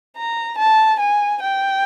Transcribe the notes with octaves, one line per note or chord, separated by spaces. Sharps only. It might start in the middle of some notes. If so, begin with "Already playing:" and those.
A#5
A5
G#5
G5